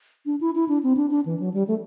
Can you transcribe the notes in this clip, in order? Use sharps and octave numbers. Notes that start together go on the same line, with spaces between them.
D4
E4
E4
D4
C4
D4
D4
E3
F#3
G3
A3